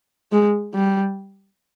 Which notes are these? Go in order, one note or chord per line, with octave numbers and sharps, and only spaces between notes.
G#3
G3